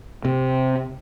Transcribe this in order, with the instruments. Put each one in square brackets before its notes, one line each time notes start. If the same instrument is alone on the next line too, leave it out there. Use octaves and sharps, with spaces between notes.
[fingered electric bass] C3